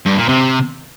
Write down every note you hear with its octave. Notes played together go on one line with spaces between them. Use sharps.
G2
A#2
C3